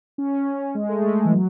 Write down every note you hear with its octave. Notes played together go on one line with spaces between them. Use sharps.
C#4
G#3
A3
G#3
E3
F#3